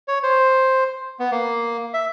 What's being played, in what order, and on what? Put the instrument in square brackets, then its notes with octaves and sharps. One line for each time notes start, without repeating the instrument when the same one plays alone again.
[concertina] C#5
C5
B3
A#3
E5